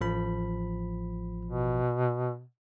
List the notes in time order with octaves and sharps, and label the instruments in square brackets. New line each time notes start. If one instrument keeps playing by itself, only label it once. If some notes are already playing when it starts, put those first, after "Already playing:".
[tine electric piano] A1 F3 B5
[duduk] B2